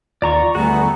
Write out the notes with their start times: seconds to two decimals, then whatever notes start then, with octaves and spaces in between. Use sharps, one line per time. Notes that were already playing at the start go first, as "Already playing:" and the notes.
0.22 D#2 F4 D5 A#5 C#6
0.55 D2 G3 A3 B3 F#4 G#4 A#5